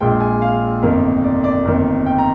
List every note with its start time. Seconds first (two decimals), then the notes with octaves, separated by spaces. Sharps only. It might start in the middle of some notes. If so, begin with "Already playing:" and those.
0.01 A#1 A#2 G#3 G5
0.20 G#5
0.42 F5
0.82 G1 F2 D#3 A#3
1.24 D5
1.44 D5
1.65 G1 F2 D#3 A#3
2.06 G5
2.18 A#5